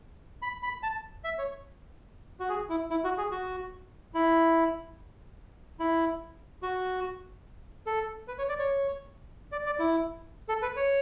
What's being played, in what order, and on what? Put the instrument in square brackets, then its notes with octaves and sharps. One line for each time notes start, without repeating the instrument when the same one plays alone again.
[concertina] B5
B5
A5
E5
C#5
F#4
G#4
E4
E4
F#4
G#4
F#4
E4
E4
F#4
A4
B4
C#5
D5
C#5
D5
D5
E4
A4
B4
C#5